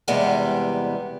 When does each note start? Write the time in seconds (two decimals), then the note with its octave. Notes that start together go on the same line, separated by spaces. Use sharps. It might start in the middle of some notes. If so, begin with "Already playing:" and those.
0.08 E2 C3 G3 G#3 B3